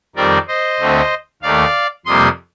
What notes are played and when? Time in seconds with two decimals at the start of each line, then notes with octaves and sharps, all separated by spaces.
0.16 F2 D#3 G3 C4 A#4 D5
0.48 C5 D#5
0.79 D2 D3 A3 C4
1.42 D#2 D#3 A3 D5 F5
2.06 F2 C3 G3 A#3 C6 D#6